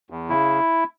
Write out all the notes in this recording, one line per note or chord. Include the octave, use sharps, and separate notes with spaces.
E2
C#3 E4